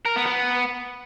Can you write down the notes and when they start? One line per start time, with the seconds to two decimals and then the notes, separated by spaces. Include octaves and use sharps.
0.05 A#4
0.16 B3
0.26 B3